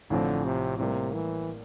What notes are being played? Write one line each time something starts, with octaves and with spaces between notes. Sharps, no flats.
A1 A2 D3 F3 C4
C3
A2 C3 G3 A#3
E3